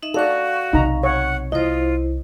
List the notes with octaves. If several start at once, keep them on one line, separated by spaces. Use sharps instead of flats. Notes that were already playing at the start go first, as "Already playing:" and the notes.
D#4 D#5 E5
F#4 A4 D5 F5 C#6
B1 C3 D#4 A#5
C#5 F#5
C2 E4 F4 C5 D#5